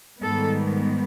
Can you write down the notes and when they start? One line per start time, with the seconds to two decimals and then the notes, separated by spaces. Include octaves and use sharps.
0.23 G#2 D#3 G3 B3 A4